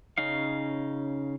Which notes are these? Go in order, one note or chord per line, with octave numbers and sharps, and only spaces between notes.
C#3 C#4 D#4 F5